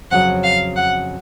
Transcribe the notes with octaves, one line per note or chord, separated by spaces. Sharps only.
F2 C#3 F#3 F#5
F5
F#5